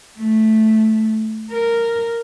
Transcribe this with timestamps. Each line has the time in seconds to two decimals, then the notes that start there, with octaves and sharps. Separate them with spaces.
0.18 A3
1.52 A#4